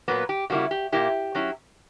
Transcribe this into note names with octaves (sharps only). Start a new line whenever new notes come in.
A#2 F#3 A#3 B3 B4
G4
C#3 G3 A#3 E4 F#4
G4
A#2 A#3 E4 G4
F#3 C#4 E4